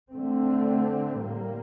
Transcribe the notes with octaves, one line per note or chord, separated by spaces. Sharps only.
D3 A3 C4
A2 G3 A#3